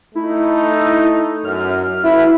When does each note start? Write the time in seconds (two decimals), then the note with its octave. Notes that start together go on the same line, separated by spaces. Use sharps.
0.15 A3 D#4 E4
1.44 F#2 F6
2.04 A2 E4 F#4 B4